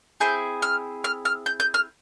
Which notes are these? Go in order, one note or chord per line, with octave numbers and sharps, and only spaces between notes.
C4 E4 G#4 G6
F6
F6
F6
G6
G6
F6